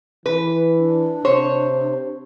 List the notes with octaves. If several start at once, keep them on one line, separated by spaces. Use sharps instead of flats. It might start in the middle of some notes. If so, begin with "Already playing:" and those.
E3 B4
D4
C3 C5 C#5